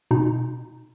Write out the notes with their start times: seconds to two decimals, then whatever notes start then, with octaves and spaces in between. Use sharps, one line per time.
0.11 B2 D#4